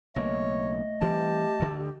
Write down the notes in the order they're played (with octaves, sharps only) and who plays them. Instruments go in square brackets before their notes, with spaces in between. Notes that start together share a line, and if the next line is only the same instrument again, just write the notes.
[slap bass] B1 C#3 A#3 [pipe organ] A3 D#5 [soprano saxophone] C#5
[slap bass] E3 G3 C4 [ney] G4 [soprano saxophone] A5
[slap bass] D2 D3